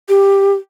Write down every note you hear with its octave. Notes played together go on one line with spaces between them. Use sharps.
G4